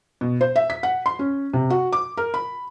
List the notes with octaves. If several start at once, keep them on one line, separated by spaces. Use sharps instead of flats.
B2
C5
E5
B6
F#5
C6
C#4
C3
F#4
D6
A#4
B5